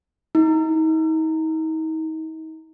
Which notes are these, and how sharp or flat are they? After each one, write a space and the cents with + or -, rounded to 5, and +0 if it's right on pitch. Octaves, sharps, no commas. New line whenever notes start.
D#4 +40